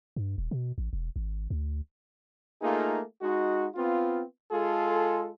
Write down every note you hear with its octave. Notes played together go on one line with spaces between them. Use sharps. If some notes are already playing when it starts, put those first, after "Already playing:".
G2
D#1
B2
A1
E1
G#1
D2
A3 A#3 D#4 F4 G#4
G#3 D#4 F#4
B3 C4 F4
G#3 F4 G#4 A4